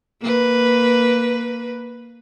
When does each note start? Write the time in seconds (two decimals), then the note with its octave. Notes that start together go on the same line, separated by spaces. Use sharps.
0.21 A#3 B4